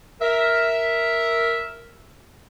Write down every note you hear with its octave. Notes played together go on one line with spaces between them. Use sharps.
A#4 E5